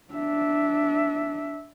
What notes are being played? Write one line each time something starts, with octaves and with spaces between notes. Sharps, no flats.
D4 E5